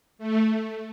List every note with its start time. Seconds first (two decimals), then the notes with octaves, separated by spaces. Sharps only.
0.18 A3